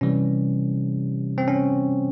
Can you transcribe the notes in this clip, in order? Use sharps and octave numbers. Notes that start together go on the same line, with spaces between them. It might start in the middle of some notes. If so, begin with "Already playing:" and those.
C3 E3 G3 C#4
C4
C#4